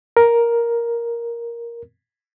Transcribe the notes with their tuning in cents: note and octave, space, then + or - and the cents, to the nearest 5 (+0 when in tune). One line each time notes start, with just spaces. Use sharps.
A#4 +5